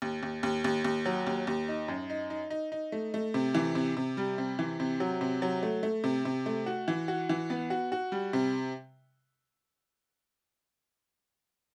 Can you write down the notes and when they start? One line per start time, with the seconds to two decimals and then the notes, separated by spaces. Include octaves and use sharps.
0.02 D#2
0.23 D#2
0.43 D#2
0.64 D#2
0.84 D#2
1.06 F#3
1.27 D#2
1.47 D#2
1.68 D#4
1.88 F#2
2.10 D#4
2.30 D#4
2.50 D#4
2.72 D#4
2.92 A3
3.14 A3
3.34 C3
3.55 E3
3.75 C3
3.97 C3
4.17 G3
4.38 C3
4.59 E3
4.80 C3
5.00 F#3
5.21 C3
5.42 F#3
5.63 A3
5.83 A3
6.04 C3
6.25 C3
6.46 A3
6.66 F#4
6.88 E3
7.08 F#4
7.29 E3
7.50 B3
7.70 F#4
7.92 F#4
8.12 G3
8.33 C3